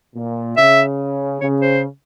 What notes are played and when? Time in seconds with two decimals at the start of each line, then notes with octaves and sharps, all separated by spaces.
0.15 A#2
0.57 C#3 E5
1.41 C#3 C#5
1.62 C5